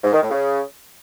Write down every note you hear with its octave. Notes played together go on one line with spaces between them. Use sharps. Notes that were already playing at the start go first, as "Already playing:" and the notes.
G#2
D#3
A2
C#3